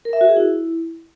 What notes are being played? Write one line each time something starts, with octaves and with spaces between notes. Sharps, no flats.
A#4
E5
F#4
G#4
E4